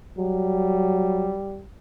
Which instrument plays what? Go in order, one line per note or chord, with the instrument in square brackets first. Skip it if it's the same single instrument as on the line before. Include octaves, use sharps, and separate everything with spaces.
[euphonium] F#3 [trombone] G3